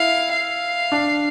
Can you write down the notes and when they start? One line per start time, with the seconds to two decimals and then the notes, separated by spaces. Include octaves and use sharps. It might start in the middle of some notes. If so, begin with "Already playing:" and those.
Already playing: E4 F5
0.31 F5
0.92 D4